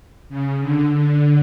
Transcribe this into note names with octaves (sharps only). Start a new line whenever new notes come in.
C#3
D3
D3